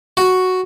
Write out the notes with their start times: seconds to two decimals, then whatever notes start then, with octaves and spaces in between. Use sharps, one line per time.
0.17 F#4